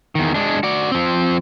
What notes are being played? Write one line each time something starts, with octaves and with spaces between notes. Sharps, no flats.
E2 D#3
G#3 D4
F#4 D5
F3 C4